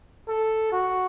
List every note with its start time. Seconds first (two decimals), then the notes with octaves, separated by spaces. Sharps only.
0.28 A4
0.72 F#4